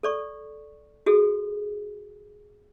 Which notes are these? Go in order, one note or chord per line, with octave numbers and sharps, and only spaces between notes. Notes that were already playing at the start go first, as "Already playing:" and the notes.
A4 D5 C#6
F#4 G#4 A4